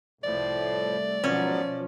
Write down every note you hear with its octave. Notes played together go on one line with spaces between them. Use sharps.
C2 A2 F3 A3 D5
G#2 B2 F3 F#3 B3 C#4